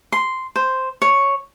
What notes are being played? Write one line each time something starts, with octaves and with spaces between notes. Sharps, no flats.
C6
C5
C#5